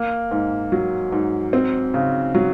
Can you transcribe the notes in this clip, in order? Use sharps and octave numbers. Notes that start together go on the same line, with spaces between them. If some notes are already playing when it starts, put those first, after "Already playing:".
Already playing: A#3
G#2
F#3
G#2
C4
C#3
F#3